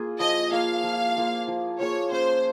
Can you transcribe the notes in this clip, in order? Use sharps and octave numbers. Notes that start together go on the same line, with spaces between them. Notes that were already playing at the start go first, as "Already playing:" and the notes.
Already playing: A#3 F4 G#4
F3 D#5
A#3 F4 G#4 F5
F3
A#3 F4 G#4
F3
A#3 F4 G#4 C#5
C#4 C5